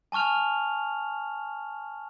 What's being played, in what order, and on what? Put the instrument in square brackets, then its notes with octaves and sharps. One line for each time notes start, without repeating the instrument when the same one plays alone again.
[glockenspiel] G#5 A5 C#6 F6 F7